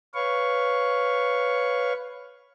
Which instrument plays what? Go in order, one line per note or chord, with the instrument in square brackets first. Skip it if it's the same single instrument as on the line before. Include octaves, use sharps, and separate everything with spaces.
[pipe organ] B4 C#5 F5 C#6